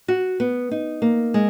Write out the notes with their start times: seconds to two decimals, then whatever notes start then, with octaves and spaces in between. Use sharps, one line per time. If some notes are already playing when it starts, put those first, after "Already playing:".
0.08 F#4
0.40 B3
0.71 D#4
1.02 A#3
1.34 G#3